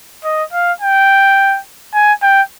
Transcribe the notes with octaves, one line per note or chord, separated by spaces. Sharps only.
D#5
F5
G5
G#5
G5